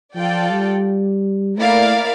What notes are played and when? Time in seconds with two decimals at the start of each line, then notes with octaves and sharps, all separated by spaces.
0.15 F3 F4 A4 D5 G5
0.51 G3
1.58 A3 A#3 E4 A#4 D5 F5